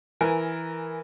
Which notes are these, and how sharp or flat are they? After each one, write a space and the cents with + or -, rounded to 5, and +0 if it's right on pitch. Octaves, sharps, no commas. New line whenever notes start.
E3 +0 A#4 +5 G#5 +0